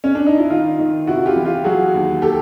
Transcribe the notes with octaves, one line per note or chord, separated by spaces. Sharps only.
C#4
D4
D#4
E4
D#3 D#4 F4
D#3
C3 E4 F#4
F4 G4
E3
F4 G4
F#3 F#4 G#4
D#2
G4 A4